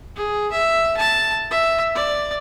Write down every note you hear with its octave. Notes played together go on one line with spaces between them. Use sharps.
G#4
E5
A5
E5
D5